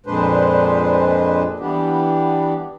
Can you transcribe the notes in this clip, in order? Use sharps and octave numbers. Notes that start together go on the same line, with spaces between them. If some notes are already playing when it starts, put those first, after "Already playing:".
F2 A#2 G#3 D4 B4 C5
E3 G3 B3 D4 G4